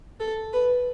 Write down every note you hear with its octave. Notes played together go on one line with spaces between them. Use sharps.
A4
B4